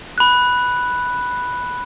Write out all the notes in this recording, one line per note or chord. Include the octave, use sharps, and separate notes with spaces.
B5 F#6